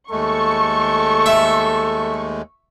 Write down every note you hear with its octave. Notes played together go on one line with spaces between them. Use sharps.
D#2 G#3 A3 A4 C#6
E5